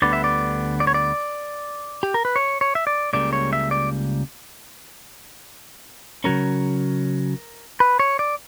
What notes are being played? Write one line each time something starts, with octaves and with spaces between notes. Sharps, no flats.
D2 D3 G3 B3 D5
E5
D5
D5
C#5
D5
G4
A#4
B4
C#5
C#5
E5
D5
C#2 C#3 G3 A#3 D5
C#5
E5
D5
C#3 F#3 C#4 A#4
B4
C#5
D5